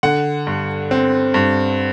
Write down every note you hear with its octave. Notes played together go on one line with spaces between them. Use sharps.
D3 F#5
G2
C4
G2